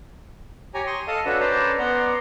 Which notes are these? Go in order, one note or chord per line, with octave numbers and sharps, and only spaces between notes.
G4 C#5 G#5 A#5
C6 C#6 D#6
A4 D#5 F5 A5 D#6
C#4 D4 F#4 A4 B4
C#4 B4 C5 D5 A5 A#5
B3 D5 F#5 A#5 C6